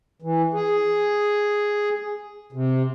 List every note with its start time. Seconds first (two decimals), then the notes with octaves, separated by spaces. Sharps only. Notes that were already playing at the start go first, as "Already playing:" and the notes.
0.22 E3
0.54 G#4
2.53 C3